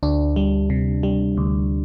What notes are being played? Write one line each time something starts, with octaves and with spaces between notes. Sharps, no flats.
D2 D4
G3
C3
G3
D2